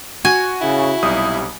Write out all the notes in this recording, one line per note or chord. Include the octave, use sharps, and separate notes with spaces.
F#4 G#5
C#3 E4
B1 C3 G3 D#6